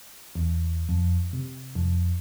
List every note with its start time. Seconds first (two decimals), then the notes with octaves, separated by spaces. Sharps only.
0.35 E2
0.89 F2
1.33 C3
1.75 F2